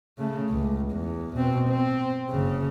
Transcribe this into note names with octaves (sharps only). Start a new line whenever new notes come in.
C#3 A3
C#2
E2
B2 C4
C4
F#1 C#3